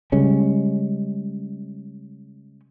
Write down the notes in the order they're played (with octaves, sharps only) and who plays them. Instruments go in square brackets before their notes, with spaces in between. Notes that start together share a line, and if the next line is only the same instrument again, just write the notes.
[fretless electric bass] C#3 G3 G#3 C#4